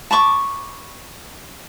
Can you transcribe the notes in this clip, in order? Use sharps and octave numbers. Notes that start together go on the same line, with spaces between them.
A5 B5 C#6 D6